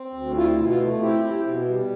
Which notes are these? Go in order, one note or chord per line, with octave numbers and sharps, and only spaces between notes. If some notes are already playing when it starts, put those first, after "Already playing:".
Already playing: C4
D2
E4 F4
B2
F4
A3
C4 E4 G4
E4
B2
G3